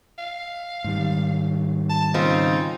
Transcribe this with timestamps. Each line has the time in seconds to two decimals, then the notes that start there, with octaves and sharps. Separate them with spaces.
0.19 F5
0.84 G#2 D#3 G3
1.90 A5
2.14 C#3 C4 D#4 F4